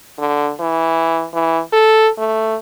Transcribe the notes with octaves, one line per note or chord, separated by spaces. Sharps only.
D3
E3
E3
A4
A3